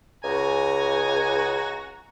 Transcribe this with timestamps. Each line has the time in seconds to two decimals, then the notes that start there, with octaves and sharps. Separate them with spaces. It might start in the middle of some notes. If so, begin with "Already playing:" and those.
0.24 C#2 F#4 G#5 A#5